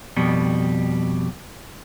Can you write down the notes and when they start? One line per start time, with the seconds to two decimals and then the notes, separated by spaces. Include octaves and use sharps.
0.17 F2 B2 G3